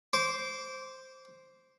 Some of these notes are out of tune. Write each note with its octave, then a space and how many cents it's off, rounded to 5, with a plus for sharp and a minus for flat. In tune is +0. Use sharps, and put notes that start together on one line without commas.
C5 +0 D6 -25